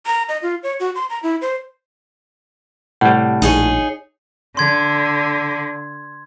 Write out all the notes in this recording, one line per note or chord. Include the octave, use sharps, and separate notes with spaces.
A#5
D#5
F4
C#5
F#4
C6
A#5
E4
C5
A2 C3 G3 F#5
A#1 D#4 G#4 C#5
D3 C6 G#6